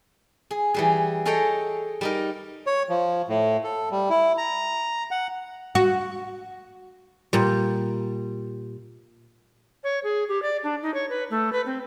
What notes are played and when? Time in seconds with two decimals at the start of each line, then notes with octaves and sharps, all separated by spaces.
0.51 G#4
0.74 E3 G3 G#4
1.25 G#4 A4 C#5 D#5 G5 A#5
2.01 G3 D#4 A#4
2.67 C#5
2.89 F3
3.28 A2
3.64 A4
3.91 G3
4.09 E4
4.38 A#5
5.11 F#5
5.75 F#4
7.33 A#2 G3
9.84 C#5
10.04 G#4
10.28 G4
10.42 D5
10.63 D4
10.82 D#4
10.94 C#5
11.10 B4
11.30 A3
11.53 B4
11.66 C4